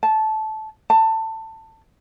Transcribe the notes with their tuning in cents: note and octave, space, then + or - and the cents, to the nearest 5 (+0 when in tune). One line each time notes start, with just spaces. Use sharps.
A5 -15
A5 +20